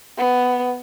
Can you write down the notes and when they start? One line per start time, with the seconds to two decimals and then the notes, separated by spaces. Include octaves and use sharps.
0.18 B3